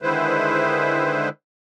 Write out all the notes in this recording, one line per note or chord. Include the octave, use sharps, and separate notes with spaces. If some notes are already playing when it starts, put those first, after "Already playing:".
D3 D#3 G#3 E4 B4 C5